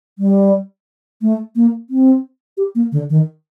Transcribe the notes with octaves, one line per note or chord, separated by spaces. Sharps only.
G3
A3
A#3
C4
G4
A#3
D3
D#3